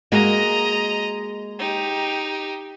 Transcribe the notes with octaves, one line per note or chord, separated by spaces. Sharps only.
G#3 A#3 F#4 D#5 A#5
D#4 G4